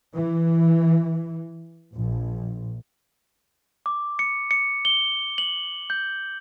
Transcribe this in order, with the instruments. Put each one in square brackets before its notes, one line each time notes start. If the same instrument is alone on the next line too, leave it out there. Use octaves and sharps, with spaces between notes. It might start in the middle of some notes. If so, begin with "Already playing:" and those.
[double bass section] E3
A#1
[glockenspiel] D6
C#7
C#7
G7
F#7
G6